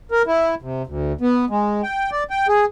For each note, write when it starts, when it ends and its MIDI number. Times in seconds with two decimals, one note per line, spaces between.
0.11 0.22 70
0.27 0.55 64
0.62 0.82 48
0.87 1.13 38
1.21 1.45 59
1.50 1.82 56
1.83 2.10 79
2.12 2.23 74
2.30 2.47 79
2.48 2.65 68